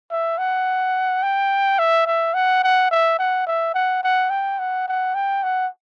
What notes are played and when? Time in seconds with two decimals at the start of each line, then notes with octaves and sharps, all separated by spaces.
0.11 E5
0.38 F#5
1.23 G5
1.79 E5
2.07 E5
2.34 F#5
2.63 F#5
2.91 E5
3.19 F#5
3.47 E5
3.74 F#5
4.04 F#5
4.30 G5
4.59 F#5
4.88 F#5
5.15 G5
5.43 F#5